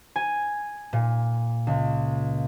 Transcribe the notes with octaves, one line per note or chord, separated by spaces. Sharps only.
G#5
A#2
C#2